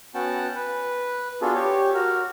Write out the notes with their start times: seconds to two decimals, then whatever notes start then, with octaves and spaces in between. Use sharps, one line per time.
0.14 B3 C#4 F#4 F#5 G5 A5
0.55 B4
1.42 B3 D4 F4 F#4 G#4 A4
1.54 G4 C#5
1.94 F#4 A#4